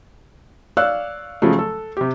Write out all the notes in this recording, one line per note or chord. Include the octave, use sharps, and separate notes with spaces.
C#5 D5 F5 E6 F#6
C#3 F3 F#3 G#3 A3
A4
C3 G4